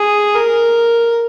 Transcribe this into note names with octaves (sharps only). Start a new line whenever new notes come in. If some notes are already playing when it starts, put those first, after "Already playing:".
Already playing: G#4
A#4